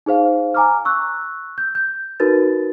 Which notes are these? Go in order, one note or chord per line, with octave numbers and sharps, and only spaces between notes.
D#4 G#4 C5 F5
G#5 A#5 D6 F6
C#6 E6 F#6
G6
G6
D#4 F#4 A#4 B4 A6